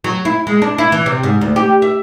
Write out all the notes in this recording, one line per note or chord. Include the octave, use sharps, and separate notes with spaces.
F#3
E4
G#3
D4
E4
E3
C3
G#2
D2
G4
E5